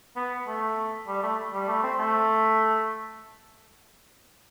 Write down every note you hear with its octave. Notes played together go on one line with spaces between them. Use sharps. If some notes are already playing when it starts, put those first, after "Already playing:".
B3
A3
G3
A3
G3
A3
C4
A3